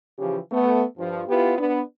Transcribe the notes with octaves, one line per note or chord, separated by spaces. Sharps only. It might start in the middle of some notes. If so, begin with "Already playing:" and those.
C#3 E3 F3 G4
A3 B3
G2 F3
B3 E4 F4 G4 B4
B3 D4